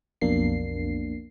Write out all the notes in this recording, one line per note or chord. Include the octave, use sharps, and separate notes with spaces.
B1 F2 B2 A#3 D4 C7